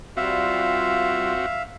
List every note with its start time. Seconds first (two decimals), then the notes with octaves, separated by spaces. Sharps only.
0.17 G3 C4 F4 F#4 E5 F5